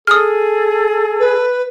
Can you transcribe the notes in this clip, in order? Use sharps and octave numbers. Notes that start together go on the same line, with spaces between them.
G#4 A4 D#6 F6
B4